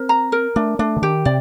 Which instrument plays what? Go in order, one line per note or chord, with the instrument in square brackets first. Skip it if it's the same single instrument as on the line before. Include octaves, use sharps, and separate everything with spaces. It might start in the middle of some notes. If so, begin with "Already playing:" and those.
Already playing: [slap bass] C4 [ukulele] A#4
[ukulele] A#5
A#4
[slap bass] A3 [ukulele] D4
[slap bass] A3 [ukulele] D4
[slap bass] D3
[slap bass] D#3 [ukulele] G4
[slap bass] C3 [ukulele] D5